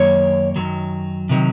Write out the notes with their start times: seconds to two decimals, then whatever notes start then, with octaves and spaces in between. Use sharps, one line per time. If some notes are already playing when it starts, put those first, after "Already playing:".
Already playing: F#2 D#3 A#3 C#5
0.56 F#2 D#3 F#3
1.29 C3 D#3 F#3